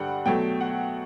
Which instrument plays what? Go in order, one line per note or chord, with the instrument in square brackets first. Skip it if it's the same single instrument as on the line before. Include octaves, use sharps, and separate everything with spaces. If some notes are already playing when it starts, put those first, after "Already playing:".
Already playing: [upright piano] G2 D3 G3 F#5 G5
B2 F#3 A3 G5
F#5